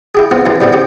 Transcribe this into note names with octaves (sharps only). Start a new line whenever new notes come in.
E4 G4 G#4
B3 C4 F4
F#2 E3 C4
A2 G3 B3 C4
C#4 G4